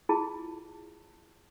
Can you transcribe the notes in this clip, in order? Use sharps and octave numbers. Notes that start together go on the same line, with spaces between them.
E4 F4 G#4 A5